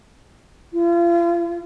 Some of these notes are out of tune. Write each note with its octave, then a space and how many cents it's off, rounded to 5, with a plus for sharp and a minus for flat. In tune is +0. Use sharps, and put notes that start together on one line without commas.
F4 -35